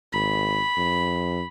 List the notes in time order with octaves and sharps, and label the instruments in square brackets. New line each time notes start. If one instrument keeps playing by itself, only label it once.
[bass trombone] G#1 [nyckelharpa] B5
[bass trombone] F2